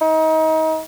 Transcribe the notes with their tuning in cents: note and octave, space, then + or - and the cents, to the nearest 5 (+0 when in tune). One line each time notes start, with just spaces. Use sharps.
D#4 +30